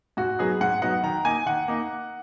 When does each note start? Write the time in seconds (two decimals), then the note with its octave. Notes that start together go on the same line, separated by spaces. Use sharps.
0.17 G#2 F#4
0.39 F#3 B3 D#4 G#4
0.61 G#2 F#5
0.82 F#3 B3 D#4 F#5
1.03 D#3 A#5
1.25 A#3 D#4 G#5
1.46 D#3 F#5
1.68 A#3 D#4